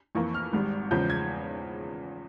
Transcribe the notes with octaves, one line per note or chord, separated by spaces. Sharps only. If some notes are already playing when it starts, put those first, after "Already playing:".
F2 E3 A#3 C#6
F6
G#1 G#2 G3
E2 C#3 F3 G#3 G6
G#6